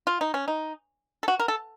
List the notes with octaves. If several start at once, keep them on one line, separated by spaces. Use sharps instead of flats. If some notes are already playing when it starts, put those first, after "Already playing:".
F4
D#4
C#4
D#4
A4
F#4
A#4
A4